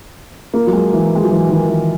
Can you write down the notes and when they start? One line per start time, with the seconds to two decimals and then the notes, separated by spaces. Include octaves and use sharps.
0.54 A#3
0.67 F#3
0.73 G#3
0.93 E3
1.15 G#3
1.23 F#3
1.30 E3
1.49 D#3
1.68 E3